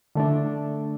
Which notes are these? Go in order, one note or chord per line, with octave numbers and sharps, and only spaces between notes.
D3 A3 D4